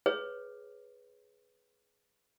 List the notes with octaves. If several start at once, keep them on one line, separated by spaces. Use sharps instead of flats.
G#4 B4 C#5